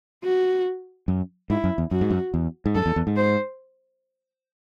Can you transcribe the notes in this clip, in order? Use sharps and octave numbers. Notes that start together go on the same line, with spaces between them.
F#4
F#2
G#2 E4
F#2
E2
F#2 F#4
G#2
F#2
E2
G#2
F#2 A4
E2
E2
G#2
C5